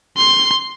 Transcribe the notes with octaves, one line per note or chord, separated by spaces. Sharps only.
C6